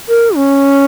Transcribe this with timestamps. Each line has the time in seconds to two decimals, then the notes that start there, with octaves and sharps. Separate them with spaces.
0.09 A#4
0.36 C#4